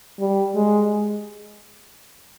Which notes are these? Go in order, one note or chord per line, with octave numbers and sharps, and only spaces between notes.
G3
G#3